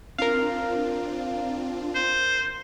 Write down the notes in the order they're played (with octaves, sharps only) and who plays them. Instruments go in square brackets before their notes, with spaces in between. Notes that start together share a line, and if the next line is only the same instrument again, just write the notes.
[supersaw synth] C4 D4 F4 [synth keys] A#4 F5
[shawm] C5